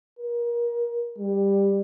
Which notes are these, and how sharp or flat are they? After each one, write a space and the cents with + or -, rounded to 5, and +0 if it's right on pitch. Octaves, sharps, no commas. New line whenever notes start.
A#4 +25
G3 +15